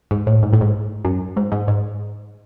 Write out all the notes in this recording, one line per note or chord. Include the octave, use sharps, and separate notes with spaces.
G#2
A2
G#2
A2
G#2
F#2
G#2
G#2
G#2